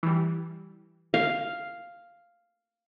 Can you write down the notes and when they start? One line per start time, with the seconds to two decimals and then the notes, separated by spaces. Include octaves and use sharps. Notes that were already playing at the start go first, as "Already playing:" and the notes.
0.03 E3 G3
1.14 F5